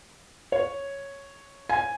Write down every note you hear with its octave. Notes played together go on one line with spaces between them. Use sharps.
C#5
G#5